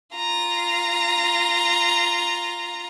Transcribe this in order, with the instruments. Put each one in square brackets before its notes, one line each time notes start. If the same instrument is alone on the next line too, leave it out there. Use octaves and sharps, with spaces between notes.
[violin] F4 A#5